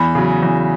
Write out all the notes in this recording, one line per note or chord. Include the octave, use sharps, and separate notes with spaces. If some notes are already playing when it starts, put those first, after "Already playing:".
Already playing: E2 B5
C#3 F#3
E2